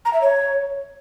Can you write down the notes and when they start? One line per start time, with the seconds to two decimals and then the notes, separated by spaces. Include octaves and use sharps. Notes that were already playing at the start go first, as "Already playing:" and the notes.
0.05 A#5
0.13 E5
0.22 C#5